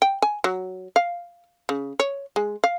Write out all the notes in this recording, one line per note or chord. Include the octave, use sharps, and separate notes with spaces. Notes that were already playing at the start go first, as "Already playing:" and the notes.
G5
G#5
F#3
F5
C#3
C#5
G#3
F5